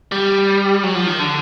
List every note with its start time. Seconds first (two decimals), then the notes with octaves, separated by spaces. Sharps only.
0.12 G3
0.83 F#3
0.95 F3
1.07 D#3
1.19 D3